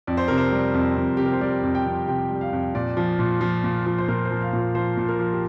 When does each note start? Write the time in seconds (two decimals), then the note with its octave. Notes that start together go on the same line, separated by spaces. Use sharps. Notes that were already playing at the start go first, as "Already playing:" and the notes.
0.07 F2 D5
0.17 C5
0.28 C3 A#4
0.38 C5
0.52 G3
0.74 F2
0.97 F2
1.17 C3 G4
1.25 A#4
1.33 C5
1.41 G3 D5
1.63 F2
1.75 G5
1.86 F2
2.08 C3 G5
2.31 G3
2.41 F5
2.53 F2
2.75 A#2 D5
2.97 F3
3.19 A#2
3.41 F3
3.64 A#2
3.86 F3
3.98 C5
4.08 A#2 A#4
4.25 C5
4.31 F3
4.41 F5
4.53 A#2
4.58 C5
4.75 F3 C5
4.97 A#2
5.08 A#4
5.19 F3
5.33 G4